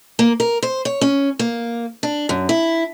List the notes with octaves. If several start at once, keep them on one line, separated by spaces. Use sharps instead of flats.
A#3
A#4
C5
C#5
C#4
A#3
D4
F#2
E4